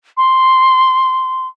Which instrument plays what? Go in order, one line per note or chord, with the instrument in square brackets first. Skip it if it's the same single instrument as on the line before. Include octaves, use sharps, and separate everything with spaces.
[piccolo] C6